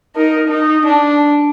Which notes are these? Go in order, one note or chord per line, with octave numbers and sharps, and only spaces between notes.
D#4 A#4
D#4
D4